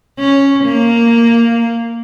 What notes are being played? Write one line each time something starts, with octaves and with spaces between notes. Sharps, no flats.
C#4
A#3